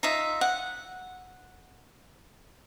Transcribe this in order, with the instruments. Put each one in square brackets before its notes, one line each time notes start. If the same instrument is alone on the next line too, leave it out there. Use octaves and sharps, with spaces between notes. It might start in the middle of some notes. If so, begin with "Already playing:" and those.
[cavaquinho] D#4 F4 E5
F#5